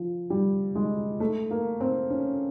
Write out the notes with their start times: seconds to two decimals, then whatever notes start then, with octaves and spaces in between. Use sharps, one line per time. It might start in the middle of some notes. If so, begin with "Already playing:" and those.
Already playing: F3
0.30 G3
0.75 G#3
1.20 A3
1.51 A#3
1.80 C4
2.10 C#4